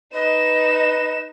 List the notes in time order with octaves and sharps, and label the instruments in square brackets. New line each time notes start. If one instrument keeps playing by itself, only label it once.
[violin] D#4 E7 [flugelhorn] B4 [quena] D#5